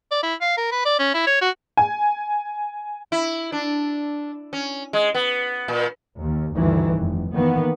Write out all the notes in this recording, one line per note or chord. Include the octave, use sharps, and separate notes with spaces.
D5
E4
F5
A#4
B4
D5
C#4
E4
C#5
F#4
G#5
E4
D4
C#4
G#3
B3
A#2
D#2
D2 G2 D#3 E3
F1
D#3 E3 A#3 B3